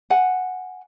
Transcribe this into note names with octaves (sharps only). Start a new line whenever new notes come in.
F#5 G#5